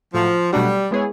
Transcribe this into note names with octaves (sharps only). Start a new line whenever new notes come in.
A2 F3 F#3 A3
B2 F#3 G3 A3 D4 F#4
G#3 B3 E4 G#4 C#5